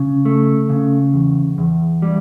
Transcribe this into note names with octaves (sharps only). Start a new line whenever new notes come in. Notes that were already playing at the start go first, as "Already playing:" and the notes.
Already playing: C#3
A3
C#3
E2
E2
G3